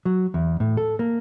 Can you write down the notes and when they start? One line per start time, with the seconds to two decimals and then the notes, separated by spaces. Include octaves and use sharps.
0.05 F#3
0.34 E2
0.60 A2
0.77 A4
0.99 A#3